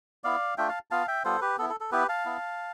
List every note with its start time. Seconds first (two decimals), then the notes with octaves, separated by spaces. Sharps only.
0.24 B3 E4 D5 F5
0.57 A3 D4 F4 E5 G5
0.69 F5 A5
0.91 B3 F4 F5 A5
1.08 E5 G5
1.25 G3 B3 F4 A4 C5
1.41 G4 B4
1.58 B3 A4
1.62 E4
1.70 A4
1.80 A4
1.92 B3 E4 G4 B4
2.09 F5 A5
2.26 B3 E4